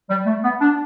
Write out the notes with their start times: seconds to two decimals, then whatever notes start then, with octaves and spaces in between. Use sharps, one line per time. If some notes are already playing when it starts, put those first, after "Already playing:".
0.10 G3
0.26 A3
0.44 B3
0.61 D4